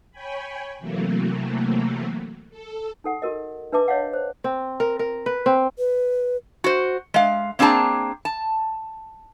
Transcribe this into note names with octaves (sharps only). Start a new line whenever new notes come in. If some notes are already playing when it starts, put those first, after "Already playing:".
C#5 G5 G#5 B5
C3 E3 F#3 A3 A#3
A4
D#4 A4 F#5
F#4 A#4 D#5
D4 B4 E5 A5 D6
C#5 D#5 F5 F#5
C5
C4
A#4
A#4
B4
C4
B4
F#4 C5
G#3 F5
A#3 C4 D4 G#4 A5 A#5
A5